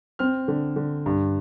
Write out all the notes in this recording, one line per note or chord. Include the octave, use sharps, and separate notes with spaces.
C4 F6
D3
D3
G2